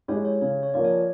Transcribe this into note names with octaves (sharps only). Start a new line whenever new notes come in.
G#3 C#4 E4 G4 C#5
C#5
C#3 C#5
C#5
F3 A#3 C#4 F4 D5
C#5